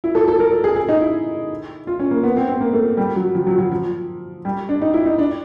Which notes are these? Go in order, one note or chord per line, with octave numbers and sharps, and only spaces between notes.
E4
A4
A4
A#4
A4
G#4
G#4
D#4
E4
F4
C#4
A#3
B3
C4
C4
A#3
A3
G3
F#3
F3
F#3
F#3
F3
G3
D4
D#4
E4
D#4
D4